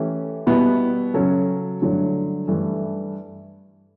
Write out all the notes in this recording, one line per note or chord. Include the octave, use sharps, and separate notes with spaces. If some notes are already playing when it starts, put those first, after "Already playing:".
Already playing: E3 A3 C#4 G4
B2 G3 B3 E4
C#3 F#3 C#4 F#4 A4
G2 D3 F#3 A3
G2 E3 A3